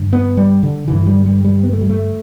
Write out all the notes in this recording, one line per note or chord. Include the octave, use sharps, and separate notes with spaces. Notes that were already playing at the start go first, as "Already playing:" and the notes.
Already playing: G2 D3
B3
G3
D3
G2 D3 E3
G3
G3
G3
B3
A3
G3
A3